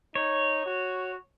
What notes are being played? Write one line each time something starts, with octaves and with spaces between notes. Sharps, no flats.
D#4 C#5
F#4